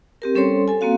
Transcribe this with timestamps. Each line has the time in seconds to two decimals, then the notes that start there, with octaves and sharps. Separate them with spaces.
0.22 C4 G4 A#4
0.35 G3 C#4 A4 C5 C#5 C6
0.68 A4 G#5
0.81 A#3 C4 F#4 F5